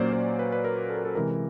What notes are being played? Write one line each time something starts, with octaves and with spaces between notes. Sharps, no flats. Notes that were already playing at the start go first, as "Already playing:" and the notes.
Already playing: A#2 F#3 A#3 C#4 C5 D5
C5
B4
B4
A#4
A4
A#4
A4
C3 E3 G#3 A#4
A#4